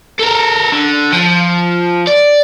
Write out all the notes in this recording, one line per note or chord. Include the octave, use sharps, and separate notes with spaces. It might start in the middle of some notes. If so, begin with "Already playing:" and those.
A4 A#4
D3
F3
D5